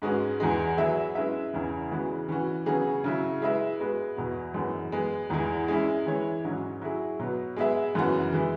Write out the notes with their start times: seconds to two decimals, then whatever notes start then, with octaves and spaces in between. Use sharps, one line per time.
0.02 G#2 G#3 C#4 F#4 B4
0.40 E2 E3 G#3
0.77 F#3 B3 G#4 E5
1.15 G#3 C#4 E4 B4 E5
1.53 E2 C#3 E3
1.91 C#3 E3 G#3 B3 F#4
2.29 E3 C#4 F#4
2.66 C#3 F#3 B3 G#4
3.04 C#3 F#3 E4
3.42 G#3 E4 B4 E5
3.79 G#3 B3 F#4 B4
4.17 E2 B2 B3
4.54 F#2 E3 G#3 B3
4.92 G#3 B3 G#4 B4
5.30 E2 E3 G#3
5.68 G#3 C#4 E4
6.06 E3 G#3 E4 C#5
6.44 G#2 F#3 C#4
6.82 F#3 E4 G#4
7.20 B2 F#3 B3
7.57 G#3 B3 G#4 E5
7.95 F#2 C#3 E3 B3 F#4
8.32 E3 G#3 E4